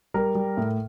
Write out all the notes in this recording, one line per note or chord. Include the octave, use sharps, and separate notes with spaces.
G3 A#4
G3
A2